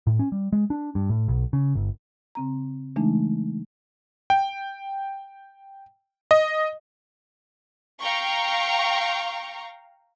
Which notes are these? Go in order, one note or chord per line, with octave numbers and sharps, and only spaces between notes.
A2
C#4
G3
G#3
D4
G2
A2
B1
C#3
G1
C#3 C4 A#5
C#3 E3 G#3 A3 D4 D#4
G5
D#5
F5 G5 A#5 C#6